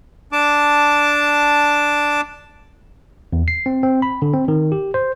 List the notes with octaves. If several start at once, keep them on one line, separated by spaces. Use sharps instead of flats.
D4 A5 D6
E2
C7
C4
C4
B5
D3
C4
D#3
G4
C5